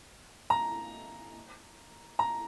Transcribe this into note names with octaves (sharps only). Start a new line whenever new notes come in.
A#5
A#5